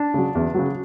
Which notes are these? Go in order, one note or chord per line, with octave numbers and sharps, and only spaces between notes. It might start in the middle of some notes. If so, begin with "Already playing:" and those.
Already playing: D4
C#3 F#3
E2
C#3 F#3